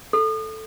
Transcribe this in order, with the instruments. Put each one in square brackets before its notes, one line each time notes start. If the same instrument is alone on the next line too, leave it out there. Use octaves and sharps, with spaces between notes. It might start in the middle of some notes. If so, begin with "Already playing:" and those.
[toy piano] A4